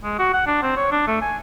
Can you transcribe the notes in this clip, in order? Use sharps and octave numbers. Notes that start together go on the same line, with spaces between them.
G#3
F#4
F#5
D4
C4
C#5
D4
A3
G#5